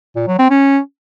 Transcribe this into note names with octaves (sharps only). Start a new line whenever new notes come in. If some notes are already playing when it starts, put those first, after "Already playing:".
A#2
F#3
C4
C#4